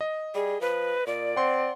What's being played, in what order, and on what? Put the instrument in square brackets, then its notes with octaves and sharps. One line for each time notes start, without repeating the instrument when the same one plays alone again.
[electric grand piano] D#5
[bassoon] G3 [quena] G#4
[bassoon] F3 [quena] B4
[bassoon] A#2 [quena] D5
[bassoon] C4 [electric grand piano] F#5 C6